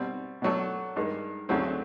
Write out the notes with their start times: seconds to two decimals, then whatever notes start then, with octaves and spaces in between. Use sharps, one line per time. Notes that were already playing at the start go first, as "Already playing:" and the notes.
Already playing: B2 G3 C4
0.42 B2 F#3 A3 D4
0.96 G2 D#3 G#3
1.49 D2 C#3 F#3 A3 C4